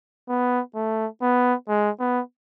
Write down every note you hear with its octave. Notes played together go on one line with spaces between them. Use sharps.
B3
A3
B3
G#3
B3